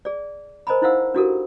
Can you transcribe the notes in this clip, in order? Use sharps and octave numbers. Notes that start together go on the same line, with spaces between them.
G#4 D5
A#4 C5 D#5 G#5 A#5 B5
D#4 E4 C5 F5 F#5 E6
D4 E4 F#4 G4 A4 A#4